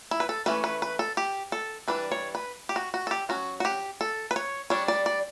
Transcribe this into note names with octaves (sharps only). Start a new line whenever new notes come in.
E4
B4
A4
E3 A3 C#4 B4
B4
B4
A4
G4
A4
E3 G3 D4 B4
C#5
B4
G4
F#4
F#4
A4
G4
F#3 C#4 F#4
F#4
G4
A4
B4
C#5
G3 D4 C#5
D5
D5